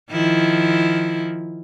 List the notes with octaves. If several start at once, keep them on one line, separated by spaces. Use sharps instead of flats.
D#3 F3 E4